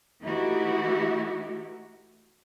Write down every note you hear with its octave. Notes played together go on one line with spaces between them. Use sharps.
E3 A3 D#4 E4 F#4 G4